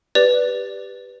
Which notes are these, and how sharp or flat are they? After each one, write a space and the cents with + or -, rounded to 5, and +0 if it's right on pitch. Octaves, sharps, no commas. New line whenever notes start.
G4 +5 B4 +0 D5 -10